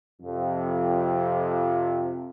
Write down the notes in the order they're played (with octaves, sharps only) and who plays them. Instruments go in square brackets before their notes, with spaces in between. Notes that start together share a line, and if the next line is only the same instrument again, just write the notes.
[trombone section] F2 C3